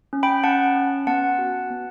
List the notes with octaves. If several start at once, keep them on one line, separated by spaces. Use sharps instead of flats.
C#4
G5 B5
C#4 F#5 A5
C#4
B3 F#5 A5
F#4
B3